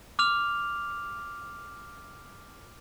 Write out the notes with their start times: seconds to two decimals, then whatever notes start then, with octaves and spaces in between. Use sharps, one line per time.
0.19 D6 F6 F7